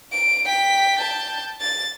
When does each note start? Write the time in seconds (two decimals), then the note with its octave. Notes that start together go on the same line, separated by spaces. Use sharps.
0.12 D7
0.45 G5 B6
0.99 A5 G6
1.61 A6